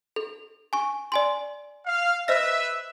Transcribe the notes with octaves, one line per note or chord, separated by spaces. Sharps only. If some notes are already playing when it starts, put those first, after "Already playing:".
A4
G#5 C#6
D5 G#5 C6
F5
B4 C5 D#5 E5 A#6